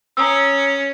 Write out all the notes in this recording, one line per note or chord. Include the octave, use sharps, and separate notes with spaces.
C#4 A#5 D#6 E6